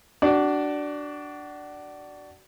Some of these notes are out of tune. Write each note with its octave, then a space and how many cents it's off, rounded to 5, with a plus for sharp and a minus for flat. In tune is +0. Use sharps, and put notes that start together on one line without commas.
D4 +0 F#4 +30 D5 +0